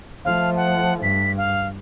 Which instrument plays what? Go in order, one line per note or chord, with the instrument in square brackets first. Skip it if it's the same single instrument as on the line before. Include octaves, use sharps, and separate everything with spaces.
[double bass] F3 A3 [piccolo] F5
[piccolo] F#5
[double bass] G2 [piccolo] B6
[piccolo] F5